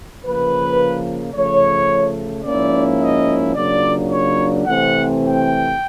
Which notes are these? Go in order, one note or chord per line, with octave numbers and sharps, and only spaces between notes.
C#3 F3 A#3 B4
C#3 F3 A3 C#5
G#2 F3 A#3 C#4 E4 D5
D#5
C#3 F#3 A#3 D4 F4 D5
C#5
C3 E3 A3 C4 F#5
G5